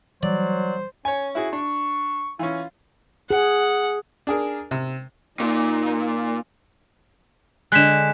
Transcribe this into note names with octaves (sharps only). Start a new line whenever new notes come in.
E3 F#3 G3 C5 D5
C#4 C#5 G#5
E4 F#4 G#4
D4 C#6
E3 C#4 F4
G#4 F#5
D4 G#4 A#4
C3
A#2 D#4
D3 G#3 F#6 B6 E7